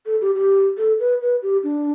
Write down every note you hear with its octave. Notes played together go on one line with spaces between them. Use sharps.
A4
G4
G4
A4
B4
B4
G4
D4